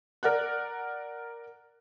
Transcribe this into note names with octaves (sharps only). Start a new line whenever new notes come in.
A#4 D5 F#5 F#6